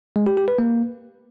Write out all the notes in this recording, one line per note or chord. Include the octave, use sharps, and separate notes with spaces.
G#3
G4
G4
B4
A#3